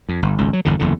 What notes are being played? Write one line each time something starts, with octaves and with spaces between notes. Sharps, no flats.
F2
G1
G#1 C#2
F#3
G1 E2 D3
F#1 E2 D3